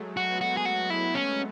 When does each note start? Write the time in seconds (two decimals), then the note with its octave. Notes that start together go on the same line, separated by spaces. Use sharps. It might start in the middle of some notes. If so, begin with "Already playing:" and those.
Already playing: F#3 G#3 A3
0.17 F#4
0.29 B3
0.41 F#4
0.57 G#4
0.65 F#4
0.90 E4
1.15 C#4